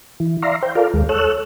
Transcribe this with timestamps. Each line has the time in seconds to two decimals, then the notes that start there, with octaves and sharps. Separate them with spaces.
0.20 E3
0.43 D5 E5 F5 A#5 C6
0.63 C5 G5
0.75 F4 A4 A#4 D5 F5
0.94 D#2 G#3
1.09 A4 C#5 E6 F#6